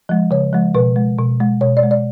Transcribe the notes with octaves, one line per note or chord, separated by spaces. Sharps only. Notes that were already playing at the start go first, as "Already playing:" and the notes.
F3 G#3
C#3 C#5
F3 G#3
B2 B4
G#3
B2
G#3
B2 C#5
D5
G#3
D5